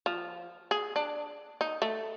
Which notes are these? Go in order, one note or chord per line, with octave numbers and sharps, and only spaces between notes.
F3
G#4
D4
D#4
A3